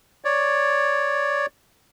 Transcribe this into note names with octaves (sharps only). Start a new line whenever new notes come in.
C#5 D5